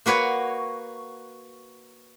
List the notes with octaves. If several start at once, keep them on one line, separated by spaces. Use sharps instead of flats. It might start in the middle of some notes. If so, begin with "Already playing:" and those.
A#3 F#4 B4 C#5